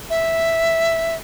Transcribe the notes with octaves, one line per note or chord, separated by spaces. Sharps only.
E5